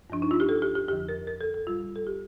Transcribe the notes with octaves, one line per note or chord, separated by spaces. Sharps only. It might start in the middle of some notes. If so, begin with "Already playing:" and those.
G2 F3 D4
D#4
F4
G4
A4
G4
G4
F2 D3 F3 G4
A#4
A#4
A4
A4
A2 G3 F4
A4
G4